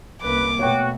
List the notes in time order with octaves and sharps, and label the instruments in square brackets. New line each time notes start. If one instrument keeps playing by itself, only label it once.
[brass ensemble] F#1 B4 [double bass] C2 A#3 [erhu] D6
[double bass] B2 A3 [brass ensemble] B3 F#4 [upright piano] C#5 G5